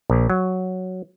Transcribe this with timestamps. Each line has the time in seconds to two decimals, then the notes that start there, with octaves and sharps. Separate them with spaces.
0.10 A#1
0.30 F#3